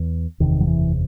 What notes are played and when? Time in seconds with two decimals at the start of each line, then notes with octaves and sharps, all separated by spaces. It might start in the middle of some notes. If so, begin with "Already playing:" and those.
Already playing: E2
0.40 F#1 E2 C3 D#3
0.60 F#3
0.67 E3